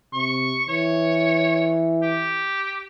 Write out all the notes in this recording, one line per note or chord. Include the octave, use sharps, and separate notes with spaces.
C3 C#6
E3 C#5
G4